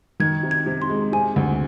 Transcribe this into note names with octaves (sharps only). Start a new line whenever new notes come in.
D#3 G#6
C3
G#6
C3
C6
G#3
C3 G#5
D2